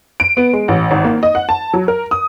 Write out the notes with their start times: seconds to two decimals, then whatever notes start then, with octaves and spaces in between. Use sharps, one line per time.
0.20 D7
0.37 B3
0.53 G#3
0.68 A1
0.91 G#1
1.04 A#3
1.23 D#5
1.35 F#5
1.49 A5
1.74 F#3
1.88 A#4
2.11 D#6